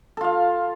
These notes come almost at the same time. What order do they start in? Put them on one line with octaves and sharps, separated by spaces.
A4 F4 F5